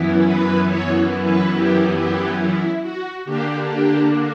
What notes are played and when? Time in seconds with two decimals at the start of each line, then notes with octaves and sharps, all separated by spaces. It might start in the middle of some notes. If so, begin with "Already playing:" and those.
Already playing: F#2 E3 B3 E4
0.26 B4
0.68 C#5
1.25 B4
1.54 G4
1.97 G4
2.40 E4
2.82 F#4
3.25 D3 A#3 D4 G4
3.67 G4